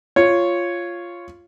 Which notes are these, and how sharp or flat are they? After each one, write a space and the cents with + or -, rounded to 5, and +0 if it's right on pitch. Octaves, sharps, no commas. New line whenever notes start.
F4 -5 C#5 +0